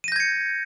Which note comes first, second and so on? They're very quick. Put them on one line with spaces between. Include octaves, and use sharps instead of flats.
D#7 A#6 G6 G#6 C#7